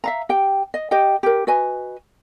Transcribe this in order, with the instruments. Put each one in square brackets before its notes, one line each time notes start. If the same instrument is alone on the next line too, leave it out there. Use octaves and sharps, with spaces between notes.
[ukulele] E5 F5 A#5
G4 G5
D#5
G4 D#5 G5
G4 A#4
F#4 B4 D#5 G#5